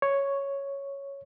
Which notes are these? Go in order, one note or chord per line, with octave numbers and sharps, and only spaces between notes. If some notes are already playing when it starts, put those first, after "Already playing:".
C#5